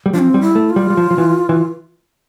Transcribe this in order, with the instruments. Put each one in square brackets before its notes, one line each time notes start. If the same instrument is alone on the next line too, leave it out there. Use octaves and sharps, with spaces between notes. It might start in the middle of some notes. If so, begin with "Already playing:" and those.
[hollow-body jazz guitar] G3
[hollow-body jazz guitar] F3 [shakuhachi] D4
[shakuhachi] C4
[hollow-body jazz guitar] G3
[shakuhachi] E4
[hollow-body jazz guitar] A3
[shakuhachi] F4
[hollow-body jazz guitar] G3
G3
F3
F3
E3
E3